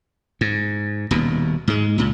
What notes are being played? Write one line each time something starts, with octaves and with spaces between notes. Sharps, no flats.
G#2
D#1 D#2 B2
G#2 G#3
C#2 A#2